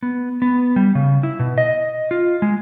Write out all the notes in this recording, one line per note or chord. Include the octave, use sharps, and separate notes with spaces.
B3
B3
G3
C#3
E4
B2
D#5
F4
G#3